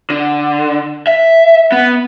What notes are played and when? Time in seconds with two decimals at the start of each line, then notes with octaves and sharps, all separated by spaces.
0.10 D3
1.07 E5
1.72 B3